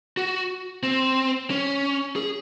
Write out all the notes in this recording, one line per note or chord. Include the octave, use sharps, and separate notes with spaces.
F#4
C4
C#4
G#4